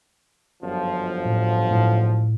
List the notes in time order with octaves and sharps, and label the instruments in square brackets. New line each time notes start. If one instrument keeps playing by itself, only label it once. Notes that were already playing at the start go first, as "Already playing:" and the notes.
[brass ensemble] G1 F#2 F3
[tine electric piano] A2
A2